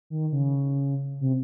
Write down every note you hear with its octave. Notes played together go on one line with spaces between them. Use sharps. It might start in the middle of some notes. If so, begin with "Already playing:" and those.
D#3
C#3
C3